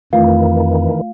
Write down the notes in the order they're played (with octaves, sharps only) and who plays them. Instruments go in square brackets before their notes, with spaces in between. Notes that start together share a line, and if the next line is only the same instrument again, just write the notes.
[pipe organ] F2 [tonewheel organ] D#3 E3 [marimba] A3 F4 [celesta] F5